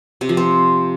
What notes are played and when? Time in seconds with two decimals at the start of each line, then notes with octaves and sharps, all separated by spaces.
0.21 C3
0.29 F3
0.37 C4